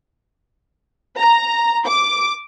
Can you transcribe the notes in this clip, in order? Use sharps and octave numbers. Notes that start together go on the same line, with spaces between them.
A#5
D6